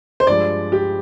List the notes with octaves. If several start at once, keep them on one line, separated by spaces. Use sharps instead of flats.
C5
G2 F3 G#3 D5
G4